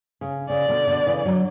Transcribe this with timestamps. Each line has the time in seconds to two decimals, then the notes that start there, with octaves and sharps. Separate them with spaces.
0.21 C#3
0.49 C#3 D5
0.68 B2 D3
0.87 B2 D3
1.06 C#3 E3
1.26 D3 F#3